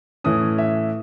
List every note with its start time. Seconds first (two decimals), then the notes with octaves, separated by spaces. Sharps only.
0.24 A2 E3 A3 C#4 D#6
0.58 E5